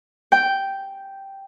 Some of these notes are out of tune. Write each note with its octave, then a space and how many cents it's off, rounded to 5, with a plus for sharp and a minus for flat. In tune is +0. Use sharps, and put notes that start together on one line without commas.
G5 -5